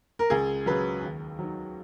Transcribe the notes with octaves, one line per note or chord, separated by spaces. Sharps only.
A#4
C#2 G#4
C#3 F#3 B4
D#2
D#3 F#3